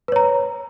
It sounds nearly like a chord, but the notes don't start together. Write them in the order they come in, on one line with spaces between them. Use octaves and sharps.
B4 C#5 A#5